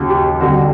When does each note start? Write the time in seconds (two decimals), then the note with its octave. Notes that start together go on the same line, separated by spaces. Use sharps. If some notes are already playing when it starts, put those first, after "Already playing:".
Already playing: D#2 C#3 F#3
0.09 G4
0.41 F2 D3 G3 F#4